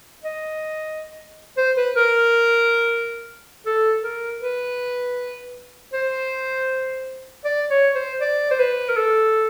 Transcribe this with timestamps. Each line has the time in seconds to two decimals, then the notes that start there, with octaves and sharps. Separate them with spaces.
0.24 D#5
1.57 C5
1.77 B4
1.96 A#4
3.66 A4
4.04 A#4
4.42 B4
5.93 C5
7.45 D5
7.71 C#5
7.95 C5
8.21 D5
8.51 C5
8.59 B4
8.89 A#4
8.97 A4